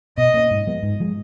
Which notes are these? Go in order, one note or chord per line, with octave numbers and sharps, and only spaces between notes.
B2 D#5
A#3 C#4
G#2
F3 G#3 B3
G#2
F3 G#3